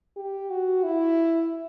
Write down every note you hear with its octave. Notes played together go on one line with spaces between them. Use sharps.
G4
F#4
E4